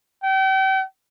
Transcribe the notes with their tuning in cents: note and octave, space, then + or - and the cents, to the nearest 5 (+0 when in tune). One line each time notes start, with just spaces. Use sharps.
G5 -40